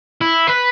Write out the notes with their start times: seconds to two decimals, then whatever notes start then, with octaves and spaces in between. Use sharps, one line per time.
0.21 E4
0.47 B4